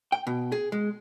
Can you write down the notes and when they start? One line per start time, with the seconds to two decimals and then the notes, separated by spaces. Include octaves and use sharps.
0.12 G5
0.27 B2
0.52 G#4
0.72 G#3